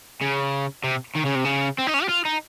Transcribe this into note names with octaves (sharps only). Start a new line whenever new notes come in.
C#3
C3
D#3
C#3
C3
C#3
C4
D#4
C#4
G4
F4
D#4